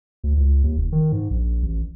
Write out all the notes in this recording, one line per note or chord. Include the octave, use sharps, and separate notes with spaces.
D2
C#2
D#2
F1
D#3
G#2
A#1
A1